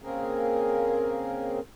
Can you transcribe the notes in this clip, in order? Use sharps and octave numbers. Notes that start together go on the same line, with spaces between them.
C#3 A#3 C4 C#4 G#4 A#4